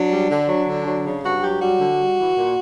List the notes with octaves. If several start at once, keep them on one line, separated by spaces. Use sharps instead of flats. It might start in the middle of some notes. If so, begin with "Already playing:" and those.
Already playing: F#3 D4
G3
D3
F#3
D3
F#3
C#3
G2 F#4
F#3 G4
G3 F#4
D3
G3
E3
A#2